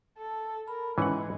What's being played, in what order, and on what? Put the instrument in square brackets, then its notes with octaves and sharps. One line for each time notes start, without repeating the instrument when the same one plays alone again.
[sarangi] A4
[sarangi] A#4 [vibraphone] B5
[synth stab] G#2 C#4 E4 [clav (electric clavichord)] E3 F#5 [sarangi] G#3